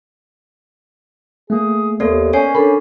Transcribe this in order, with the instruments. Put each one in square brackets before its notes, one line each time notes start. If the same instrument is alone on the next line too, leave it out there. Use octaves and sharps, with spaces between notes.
[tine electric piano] A3 A#3 [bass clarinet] G#4
[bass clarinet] D#2 [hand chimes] A#3 B3 A4 [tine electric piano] A#4 C5 D5
[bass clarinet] C#4 [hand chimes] C#5 G#5 C7
[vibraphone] D4 A4 A#4 [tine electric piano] B5